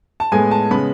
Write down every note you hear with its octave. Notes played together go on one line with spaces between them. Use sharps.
A5
A2 G#3 B3 G#5
A5
C#3 G#3 B3 B5